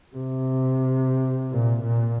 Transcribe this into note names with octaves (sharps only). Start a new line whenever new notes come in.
C3
A#2
A#2